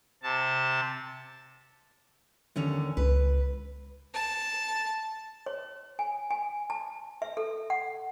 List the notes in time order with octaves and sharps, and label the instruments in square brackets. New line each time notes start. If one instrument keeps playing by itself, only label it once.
[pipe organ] C3 A5
[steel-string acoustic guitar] D#2 D3 C#4
[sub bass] C#2 [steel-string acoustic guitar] B4
[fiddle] A5
[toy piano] C#5
G#5
G#5
A5
E5
A4
F#5